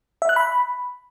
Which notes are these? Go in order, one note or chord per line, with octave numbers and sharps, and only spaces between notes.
E5
F#6
B5